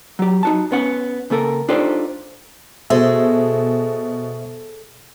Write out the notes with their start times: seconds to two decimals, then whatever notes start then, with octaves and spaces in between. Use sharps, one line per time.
0.19 F#3 G4
0.43 D#4 F#4 A5
0.72 B3 C#4 F#5
1.30 C#3 A#3 A4 A#4
1.69 D4 D#4 F4 G4 A4 C5
2.90 B2 G#4 A4 C5 D#5 E5